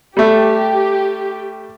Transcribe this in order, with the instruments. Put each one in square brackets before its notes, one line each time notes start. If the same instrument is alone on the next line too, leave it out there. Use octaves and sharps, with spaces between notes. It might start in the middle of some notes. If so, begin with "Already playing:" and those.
[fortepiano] G3 A3 [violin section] G4